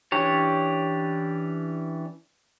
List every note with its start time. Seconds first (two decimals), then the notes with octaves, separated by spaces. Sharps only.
0.12 E3 C#4 D4 G4 C#5